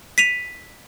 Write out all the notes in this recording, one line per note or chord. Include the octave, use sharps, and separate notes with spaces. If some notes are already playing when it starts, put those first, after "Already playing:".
B6 D#7 F7